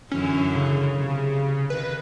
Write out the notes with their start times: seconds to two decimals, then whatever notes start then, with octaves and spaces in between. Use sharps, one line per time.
0.11 F#2 D3 E3 C#4
0.55 C#3
0.96 C3
1.70 D#3 B4